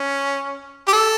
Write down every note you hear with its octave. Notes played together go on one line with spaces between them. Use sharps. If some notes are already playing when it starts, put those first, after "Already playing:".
Already playing: C#4
G4
A4